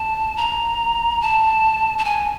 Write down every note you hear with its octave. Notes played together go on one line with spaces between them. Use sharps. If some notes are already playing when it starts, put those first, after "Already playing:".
Already playing: A5
A#5
A5
A5
G#5